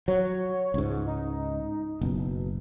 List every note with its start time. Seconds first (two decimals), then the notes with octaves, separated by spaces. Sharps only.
0.08 F#3 C#5
0.74 C#2 G#2
1.07 D#4
2.01 F#1 B2